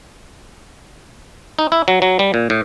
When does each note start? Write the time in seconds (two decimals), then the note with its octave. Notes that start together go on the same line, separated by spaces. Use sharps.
1.59 D#4
1.72 E4
1.88 F#3
2.02 F#3
2.19 G3
2.34 A#2
2.50 A2